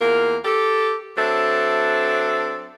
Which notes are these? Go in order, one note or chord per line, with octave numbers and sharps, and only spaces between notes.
E2 A#3 F4 A#4
G4 A4
F#3 C4 D4 A4 E5